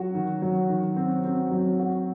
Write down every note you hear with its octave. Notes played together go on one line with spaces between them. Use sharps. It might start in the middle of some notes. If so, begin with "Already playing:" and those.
Already playing: F#3 F#4
D#3
F#3
D#3
C4
C4
F#3
F#4